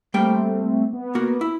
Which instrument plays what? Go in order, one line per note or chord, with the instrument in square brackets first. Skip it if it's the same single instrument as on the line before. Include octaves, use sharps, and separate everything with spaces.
[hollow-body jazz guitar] G3 A#3 G5 [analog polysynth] A3 C4
[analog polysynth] B3
[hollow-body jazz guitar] A#3 F#4 A#4
E4